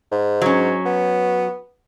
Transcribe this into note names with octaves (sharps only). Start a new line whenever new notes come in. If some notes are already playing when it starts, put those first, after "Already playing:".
G#2
F#3 C#4
B3